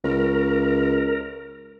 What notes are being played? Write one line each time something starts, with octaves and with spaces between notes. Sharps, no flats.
C#2 A#4